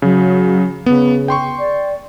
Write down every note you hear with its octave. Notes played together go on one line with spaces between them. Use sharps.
C#3 F#3
C#3 B3
G5 C6 C#6
D5